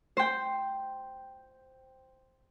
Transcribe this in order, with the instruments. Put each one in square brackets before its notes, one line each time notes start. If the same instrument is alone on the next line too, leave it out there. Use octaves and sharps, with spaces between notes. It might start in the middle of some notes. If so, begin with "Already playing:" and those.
[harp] C5 G5